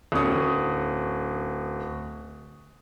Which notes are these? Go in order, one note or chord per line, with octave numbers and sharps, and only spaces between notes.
D1 C#4 C#6 D#6